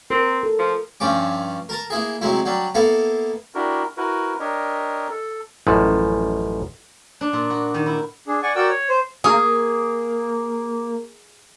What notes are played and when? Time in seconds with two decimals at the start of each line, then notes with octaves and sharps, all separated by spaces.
0.10 C4 A#4
0.43 A4
0.59 F3
1.00 G2 F3 C#4 D6
1.69 A#4 A5 A#5
1.90 A#3 E4 G#4
2.21 C3 F#3 G#3 E4
2.45 F#3 G3 D4
2.75 A#3 B3 E4 A4 F5
3.55 D4 E4 F#4 G4 A#4
3.97 E4 F#4 A#4 B4
4.40 D4 G4 A#4 C#5 D#5
5.09 A4
5.67 A1 F#2 A2 F3
7.21 D4
7.33 A#2
7.50 F#4
7.74 D#3
7.86 E4
8.27 D4 G#4
8.42 D5 F#5 G#5 C#6
8.56 F#4 A#4 D5 F#5 G5 E6
8.69 C#5
8.89 C5
9.24 A#3 G#4